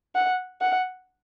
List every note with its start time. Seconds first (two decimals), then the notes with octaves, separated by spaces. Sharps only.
0.15 F#5
0.61 F#5